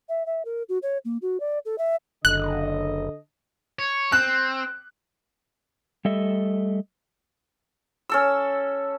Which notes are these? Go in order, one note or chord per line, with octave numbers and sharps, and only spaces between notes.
E5
E5
A#4
F#4
C#5
A#3
F#4
D5
A4
E5
F#1 D3 A4 D#5 F#6
C#5
C4 F#6
G3 A3 A4 D#5 E5
C#4 A4 E6